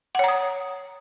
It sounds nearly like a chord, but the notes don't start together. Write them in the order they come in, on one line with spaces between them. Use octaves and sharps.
F#5 C#5 A#5 D#6